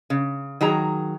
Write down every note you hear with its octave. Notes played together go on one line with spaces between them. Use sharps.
C#3
D#3 F#3 G#4 A#5